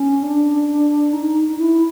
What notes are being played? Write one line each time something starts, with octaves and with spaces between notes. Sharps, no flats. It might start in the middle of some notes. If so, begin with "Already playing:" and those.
Already playing: C#4
D4
D#4
D#4
E4